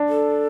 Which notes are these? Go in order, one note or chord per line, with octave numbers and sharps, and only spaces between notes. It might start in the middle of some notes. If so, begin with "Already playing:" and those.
Already playing: D4
A4